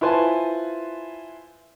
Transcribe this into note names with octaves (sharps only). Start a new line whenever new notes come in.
E4 F4 B4 C5 G#5 A5